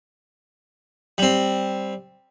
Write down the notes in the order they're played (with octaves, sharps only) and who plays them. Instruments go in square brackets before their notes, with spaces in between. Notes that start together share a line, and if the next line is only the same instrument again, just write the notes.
[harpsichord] G3 C4